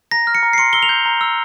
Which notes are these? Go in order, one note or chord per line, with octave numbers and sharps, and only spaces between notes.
A#5 A#6
F6
C#7
A#5
C7
C6 C#7
E6 G7
F7
G6
A#5
E6